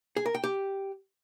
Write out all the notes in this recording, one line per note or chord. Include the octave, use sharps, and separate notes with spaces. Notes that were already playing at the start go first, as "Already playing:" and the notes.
G#4
A#4
G5
G4